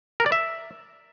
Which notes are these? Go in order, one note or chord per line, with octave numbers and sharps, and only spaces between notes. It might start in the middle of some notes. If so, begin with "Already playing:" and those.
A#4
D5
E5